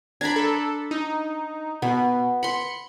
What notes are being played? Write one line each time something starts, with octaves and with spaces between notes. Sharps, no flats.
D4 A#5 B5 G#6
A4
D#4
B2 B3
B5 C6 C#7